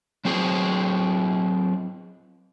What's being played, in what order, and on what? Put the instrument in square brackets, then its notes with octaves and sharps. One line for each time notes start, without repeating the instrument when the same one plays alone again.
[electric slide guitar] F#3 C4 F#4 G#4